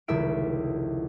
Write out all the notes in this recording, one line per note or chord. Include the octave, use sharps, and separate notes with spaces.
F1 C#2 D#3 E4 E5 D7